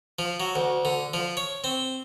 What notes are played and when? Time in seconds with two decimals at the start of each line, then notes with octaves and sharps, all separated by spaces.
0.19 F3
0.40 F#3
0.56 D2
0.85 D3
1.14 F3
1.37 C#5
1.64 C4